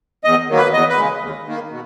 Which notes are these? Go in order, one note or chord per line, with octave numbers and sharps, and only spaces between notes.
E2 D#5
D#3 F#3 A#3
B4
E2 D#5
B4
C#3 G#3
D#2
D#3 A#3
B2